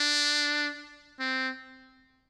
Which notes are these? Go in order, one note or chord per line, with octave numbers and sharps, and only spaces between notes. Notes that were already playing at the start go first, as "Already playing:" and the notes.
Already playing: D4
C4